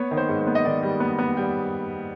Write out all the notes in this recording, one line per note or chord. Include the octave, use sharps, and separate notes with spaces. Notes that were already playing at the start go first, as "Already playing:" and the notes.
Already playing: B3 C#5
D#3
C5
G#2
C5
B3
D#5
D#3 D5
G3
B3
B3
G3